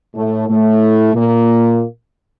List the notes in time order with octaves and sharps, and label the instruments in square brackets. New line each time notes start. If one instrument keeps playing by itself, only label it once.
[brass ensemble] A2 A3
A2 A3
A#2 A#3